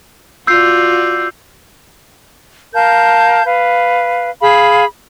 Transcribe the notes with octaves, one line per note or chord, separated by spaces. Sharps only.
F4 F#4 D5 E6 G6 C7
A#4 F5 A5 G6
B4 F5
G#4 F5 B5